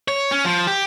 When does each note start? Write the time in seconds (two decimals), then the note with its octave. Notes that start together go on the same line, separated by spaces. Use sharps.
0.08 C#5
0.32 C#4
0.45 F3
0.67 G4